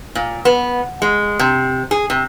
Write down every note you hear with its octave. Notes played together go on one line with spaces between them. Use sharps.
A#2
B3
G#3
C3
G#4
C3